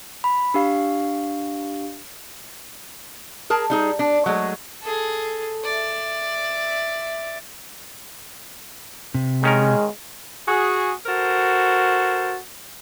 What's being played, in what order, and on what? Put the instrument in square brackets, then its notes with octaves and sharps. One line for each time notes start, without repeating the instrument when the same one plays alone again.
[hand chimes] B5
D4 G4 F5 C7
[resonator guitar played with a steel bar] G#4 A#4 A5
G3 D#4 G#4
D4
F#3 G#3 A3
[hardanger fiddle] G#4 A4
D5 E5
[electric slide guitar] C3
[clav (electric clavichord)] D#3 C#4 A#4 [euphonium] G#3
[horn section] F#4 G#4
F#4 A4 A#4 C5